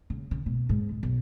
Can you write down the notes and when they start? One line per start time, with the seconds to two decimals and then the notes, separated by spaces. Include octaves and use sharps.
0.10 C#3
0.31 C#3
0.46 B2
0.69 G#2
0.91 G#3
1.03 B1